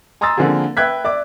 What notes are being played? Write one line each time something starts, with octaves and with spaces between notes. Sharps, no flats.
G#5 A#5 C6 D#6 E6 A6
D3 F3 A#3 C4 G#4
B4 E5 G5 F#6 G#6 B6
D5 E5 D6